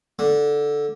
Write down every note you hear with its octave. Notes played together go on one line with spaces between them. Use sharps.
D3